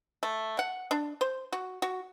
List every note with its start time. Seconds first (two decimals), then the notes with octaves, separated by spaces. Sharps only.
0.23 A3
0.59 F#5
0.91 D4
1.21 C5
1.52 F#4
1.82 F#4